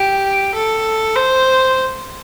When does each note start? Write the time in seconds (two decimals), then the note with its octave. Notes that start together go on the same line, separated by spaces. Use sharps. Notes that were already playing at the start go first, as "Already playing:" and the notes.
Already playing: G4
0.54 A4
1.16 C5